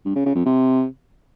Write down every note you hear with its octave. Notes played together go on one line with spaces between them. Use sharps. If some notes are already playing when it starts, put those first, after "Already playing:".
G2
C#3
C#3
F2
C3